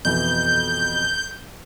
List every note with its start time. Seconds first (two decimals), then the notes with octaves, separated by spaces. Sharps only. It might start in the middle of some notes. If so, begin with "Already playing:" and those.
0.05 F2 B2 E3 G6